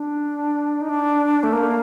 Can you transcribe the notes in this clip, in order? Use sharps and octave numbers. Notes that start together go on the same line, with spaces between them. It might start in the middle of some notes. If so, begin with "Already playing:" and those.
Already playing: D4
D#4
D4
A3
A#3